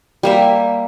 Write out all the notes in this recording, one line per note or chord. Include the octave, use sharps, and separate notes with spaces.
G3 A#3 E5